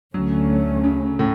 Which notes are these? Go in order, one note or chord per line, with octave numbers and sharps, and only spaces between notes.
D2 D3 F#3 A3 C#4
C#3
A2